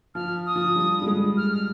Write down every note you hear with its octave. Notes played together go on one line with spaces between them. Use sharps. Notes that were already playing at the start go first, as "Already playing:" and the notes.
F3 F6
D#6
F3
G3
G3
G#3
F6
F6